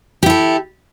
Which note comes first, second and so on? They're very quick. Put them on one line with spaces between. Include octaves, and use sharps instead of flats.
G4 E4 A4